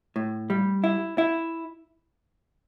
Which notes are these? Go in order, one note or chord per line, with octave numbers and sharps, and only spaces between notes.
A2
G3
E4
E4